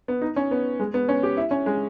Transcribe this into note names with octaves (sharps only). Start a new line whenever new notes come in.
B3
D#4
C#4
B3
G#3
B3
C#4
G4
E4
C#4
G#3